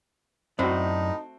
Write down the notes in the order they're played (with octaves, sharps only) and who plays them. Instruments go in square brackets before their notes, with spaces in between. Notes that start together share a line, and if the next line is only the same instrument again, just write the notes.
[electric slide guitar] F#2 D5 [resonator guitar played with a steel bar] A2 [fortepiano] C4 F#4 [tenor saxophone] D#4